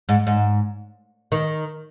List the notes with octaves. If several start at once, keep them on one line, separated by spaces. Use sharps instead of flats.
G#2
G#2
D#3